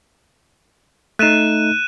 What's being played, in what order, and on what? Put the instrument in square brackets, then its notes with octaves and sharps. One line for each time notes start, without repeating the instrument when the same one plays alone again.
[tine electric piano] A3 D#4 [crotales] F#6 D#7 E7